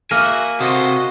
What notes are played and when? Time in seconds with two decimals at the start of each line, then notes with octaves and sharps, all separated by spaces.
0.11 A#3 F#4 E5 G#5
0.60 C3 F#4 A4 C5 D#5